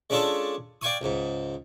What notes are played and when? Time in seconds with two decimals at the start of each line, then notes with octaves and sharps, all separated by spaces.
0.10 G#3 C#4 D4 F4 A4 C#5
0.81 D5 F5 G5 G#5 C#6 D#6
1.01 C#2 G#2